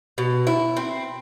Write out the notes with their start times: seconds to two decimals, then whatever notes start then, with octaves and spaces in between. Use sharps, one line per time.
0.18 B2
0.47 E4
0.77 C4